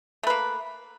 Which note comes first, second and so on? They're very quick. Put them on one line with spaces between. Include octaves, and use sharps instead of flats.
A3 B4 A#3